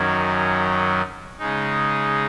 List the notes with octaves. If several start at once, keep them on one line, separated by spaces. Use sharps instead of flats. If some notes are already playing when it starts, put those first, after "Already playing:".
Already playing: F#2 D#3 F#3 C#4
C#3 G#3 D#4